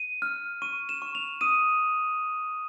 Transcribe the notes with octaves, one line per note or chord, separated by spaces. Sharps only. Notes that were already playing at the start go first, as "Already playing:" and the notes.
Already playing: D#7
F6
C#6 D#7
E7
C#6
F7
D#6 D#7